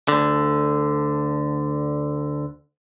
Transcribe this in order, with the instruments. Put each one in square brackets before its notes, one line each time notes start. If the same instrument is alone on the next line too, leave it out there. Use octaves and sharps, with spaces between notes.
[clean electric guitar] D2 D3